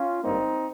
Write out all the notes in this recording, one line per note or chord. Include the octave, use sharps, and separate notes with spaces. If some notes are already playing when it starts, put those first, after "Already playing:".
Already playing: C#4 F4
G#1 G2 G3 A#3 C4 D#4